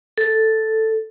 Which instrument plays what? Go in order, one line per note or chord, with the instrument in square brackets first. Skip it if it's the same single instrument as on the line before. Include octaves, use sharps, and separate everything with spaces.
[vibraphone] A4